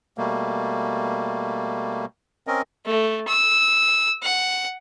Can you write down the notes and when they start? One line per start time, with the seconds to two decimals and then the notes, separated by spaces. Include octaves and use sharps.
0.18 B2 G3 A3 A#3
2.47 C4 C#4 A#4 D#5
2.85 A3
3.28 E6
4.23 F#5